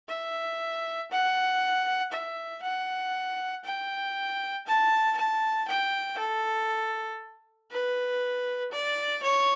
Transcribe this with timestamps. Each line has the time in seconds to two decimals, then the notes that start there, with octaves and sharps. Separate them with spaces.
0.09 E5
1.11 F#5
2.12 E5
2.63 F#5
3.64 G5
4.67 A5
5.17 A5
5.68 G5
6.18 A4
7.72 B4
8.72 D5
9.23 C#5